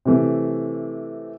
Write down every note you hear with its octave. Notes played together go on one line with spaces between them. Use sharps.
C3 E3 A3